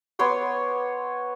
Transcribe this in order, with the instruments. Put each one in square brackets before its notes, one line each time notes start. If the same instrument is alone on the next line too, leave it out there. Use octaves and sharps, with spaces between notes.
[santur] B3 C#5 C6 D6